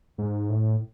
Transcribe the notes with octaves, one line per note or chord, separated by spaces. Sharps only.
G#2
A2